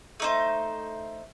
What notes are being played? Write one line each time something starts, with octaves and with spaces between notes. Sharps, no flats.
A3 D#4 C5